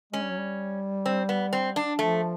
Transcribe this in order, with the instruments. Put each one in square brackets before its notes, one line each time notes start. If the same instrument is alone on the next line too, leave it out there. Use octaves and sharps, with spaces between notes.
[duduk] G#3 [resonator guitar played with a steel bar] C#4
[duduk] G3
F#3
G3
[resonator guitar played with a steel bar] C4
B3
C4
D4
[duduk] F3 [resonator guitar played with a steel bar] A3